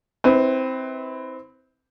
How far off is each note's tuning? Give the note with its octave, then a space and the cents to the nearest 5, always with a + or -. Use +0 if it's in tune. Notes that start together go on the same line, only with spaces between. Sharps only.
C4 +0 E4 -35 B4 +15